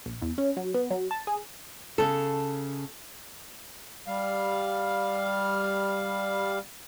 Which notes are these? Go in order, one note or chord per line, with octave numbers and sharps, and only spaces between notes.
A#1
E2
C#4
F#3
B3
F#3
A5
G#4
C#3 A4
G3 F5